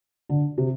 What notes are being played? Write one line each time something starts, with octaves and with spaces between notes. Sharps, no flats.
D3
C3